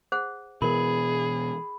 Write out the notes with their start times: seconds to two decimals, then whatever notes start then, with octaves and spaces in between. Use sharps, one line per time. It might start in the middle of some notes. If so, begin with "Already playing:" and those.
0.12 G#4 C5 F#5
0.62 B2 E3 B3 G#4 A#4 B5